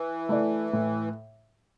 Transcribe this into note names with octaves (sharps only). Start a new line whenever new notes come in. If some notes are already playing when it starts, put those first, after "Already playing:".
Already playing: E3
A3 E4 A4 D5
A2